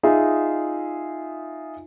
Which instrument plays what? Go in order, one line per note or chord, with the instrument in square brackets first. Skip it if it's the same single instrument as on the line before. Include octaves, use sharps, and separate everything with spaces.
[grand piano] D#4 F4 G#4 D#5 E5